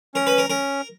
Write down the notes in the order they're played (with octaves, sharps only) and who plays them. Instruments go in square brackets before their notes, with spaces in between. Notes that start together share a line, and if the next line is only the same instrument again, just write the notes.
[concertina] C#4 [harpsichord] A#4
[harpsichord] B4
A#4
[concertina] C#4 [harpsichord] A#4